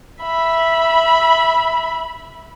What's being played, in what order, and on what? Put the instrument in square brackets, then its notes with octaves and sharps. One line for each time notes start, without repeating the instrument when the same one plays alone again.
[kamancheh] E5 B5